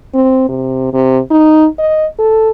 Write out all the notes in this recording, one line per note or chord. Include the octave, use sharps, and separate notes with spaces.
C4
C3
C3
D#4
D#5
A4